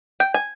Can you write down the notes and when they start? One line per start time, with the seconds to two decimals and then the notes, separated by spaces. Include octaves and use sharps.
0.20 G5
0.34 G#5